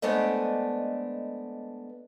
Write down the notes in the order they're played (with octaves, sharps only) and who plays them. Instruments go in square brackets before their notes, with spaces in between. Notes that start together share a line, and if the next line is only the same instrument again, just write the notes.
[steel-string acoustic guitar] G#3 A3 B3 D4 C5 D#5